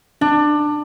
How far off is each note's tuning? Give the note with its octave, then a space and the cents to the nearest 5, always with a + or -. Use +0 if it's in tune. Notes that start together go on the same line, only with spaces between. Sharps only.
D4 +20